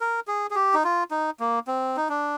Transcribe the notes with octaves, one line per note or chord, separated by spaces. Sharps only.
A#4
G#4
G#4
G4
D#4
F4
D#4
A#3
C4
D#4
D4